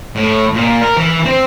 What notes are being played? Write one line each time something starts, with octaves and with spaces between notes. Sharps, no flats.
A2
A#2
A#4
E3
C4